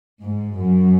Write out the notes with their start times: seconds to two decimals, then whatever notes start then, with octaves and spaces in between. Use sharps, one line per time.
0.21 G#2
0.58 F#2